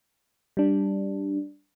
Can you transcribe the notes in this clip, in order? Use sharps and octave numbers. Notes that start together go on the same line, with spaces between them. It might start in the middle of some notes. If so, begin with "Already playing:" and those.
G3 D4